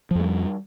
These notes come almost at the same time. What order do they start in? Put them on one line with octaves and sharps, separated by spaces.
F3 F2 G#3 G3